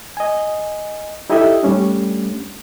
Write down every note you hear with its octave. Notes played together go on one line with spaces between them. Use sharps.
D#5 G#5
D#4 E4 G4 A4 D#5 E5
G3 A3 C#4 D4